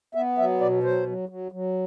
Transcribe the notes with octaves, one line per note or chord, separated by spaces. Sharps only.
B3 E5
F#3 E5
B2 D5
F#3 C5
F#3
F#3
F#3